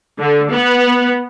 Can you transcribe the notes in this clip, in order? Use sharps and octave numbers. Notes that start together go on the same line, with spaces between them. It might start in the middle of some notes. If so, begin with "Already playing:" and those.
D3
B3